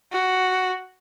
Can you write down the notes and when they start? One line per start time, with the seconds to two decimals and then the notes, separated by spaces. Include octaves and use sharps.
0.12 F#4